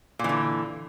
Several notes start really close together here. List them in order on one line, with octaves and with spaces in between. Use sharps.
A#2 E3 D3